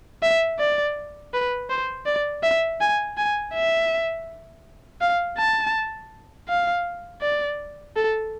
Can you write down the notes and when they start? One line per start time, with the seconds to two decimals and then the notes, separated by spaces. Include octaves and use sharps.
0.23 E5
0.59 D5
1.34 B4
1.70 C5
2.06 D5
2.43 E5
2.81 G#5
3.17 G#5
3.54 E5
5.01 F5
5.38 A5
6.49 F5
7.22 D5
7.96 A4